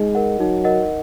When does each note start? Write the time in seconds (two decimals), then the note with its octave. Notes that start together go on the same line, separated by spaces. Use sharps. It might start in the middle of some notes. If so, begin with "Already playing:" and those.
Already playing: G#3 D#4
0.15 A#4 D#5 F#5
0.39 F#3 D#4
0.64 A#4 D#5 F#5